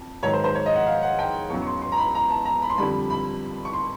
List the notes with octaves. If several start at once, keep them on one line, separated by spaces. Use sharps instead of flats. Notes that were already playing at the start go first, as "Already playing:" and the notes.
Already playing: F2
G#2 D#3 F#3 C#5
C5
C5
C#5
D#5
F#5
F5
F#5
G5
E2 C#3 F#3 C#6
C#6
C6
C6
A#5
B5
A#5
A5
A#5
B5
C6
F2 D3 G3 B5
B5
C#6
C6